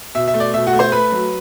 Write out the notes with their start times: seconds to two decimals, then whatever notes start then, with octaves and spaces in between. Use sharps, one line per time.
0.15 B2 E5
0.28 E5
0.34 A3
0.40 D5
0.54 B2 E5
0.67 F#4 F#5
0.73 A3
0.79 C5 C6
0.92 A3 B4 B5
1.12 F#3